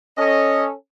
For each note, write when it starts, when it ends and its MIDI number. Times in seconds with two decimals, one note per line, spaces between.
0.18 0.72 61
0.18 0.72 69
0.18 0.65 75